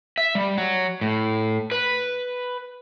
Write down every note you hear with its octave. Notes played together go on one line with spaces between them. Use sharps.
E5
G3
F#3
A2
B4